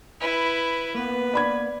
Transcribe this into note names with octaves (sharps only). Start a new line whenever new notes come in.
E4 B4
A#3 B3 B4
D5 B5 G#6